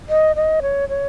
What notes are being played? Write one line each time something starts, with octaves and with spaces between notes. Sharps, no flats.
D#5
D#5
C#5
C#5